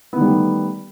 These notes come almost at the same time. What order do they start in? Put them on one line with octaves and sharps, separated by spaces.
B3 D#3 G3 A3